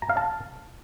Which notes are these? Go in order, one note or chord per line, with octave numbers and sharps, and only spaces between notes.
A#5
F5
A5